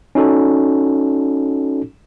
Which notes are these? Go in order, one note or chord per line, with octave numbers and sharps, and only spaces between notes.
C#4 D#4 F#4 A4